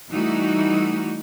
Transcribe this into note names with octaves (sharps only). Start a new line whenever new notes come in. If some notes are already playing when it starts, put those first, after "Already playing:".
E3 G3 A3 D#4 E4 F#4